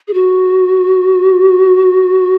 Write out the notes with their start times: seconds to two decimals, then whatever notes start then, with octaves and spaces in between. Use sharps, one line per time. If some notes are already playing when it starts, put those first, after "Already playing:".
0.08 G#4
0.14 F#4